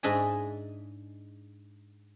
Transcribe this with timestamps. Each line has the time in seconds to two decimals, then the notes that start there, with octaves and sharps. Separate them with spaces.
0.03 G#2 D4 D#5 E5 G#5